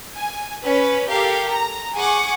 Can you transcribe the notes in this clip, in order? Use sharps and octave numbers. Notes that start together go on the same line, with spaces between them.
G#5
C#4 B4
G4 A4 A#4 F5
A#5
G#4 F#5 G#5 C#6 D6